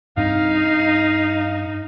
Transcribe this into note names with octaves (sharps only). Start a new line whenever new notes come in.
G2 C4 D4 D#4 F5